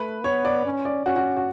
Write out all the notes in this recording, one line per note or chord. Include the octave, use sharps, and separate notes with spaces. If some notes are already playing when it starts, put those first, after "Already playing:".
Already playing: A3 B4
B3 C#5
D5
C#4
D5
C#4 F#4
F#4
F#4